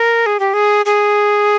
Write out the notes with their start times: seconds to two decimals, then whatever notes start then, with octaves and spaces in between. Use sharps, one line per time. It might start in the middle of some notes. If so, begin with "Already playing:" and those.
Already playing: A#4
0.26 G#4
0.40 G4
0.54 G#4
0.86 G#4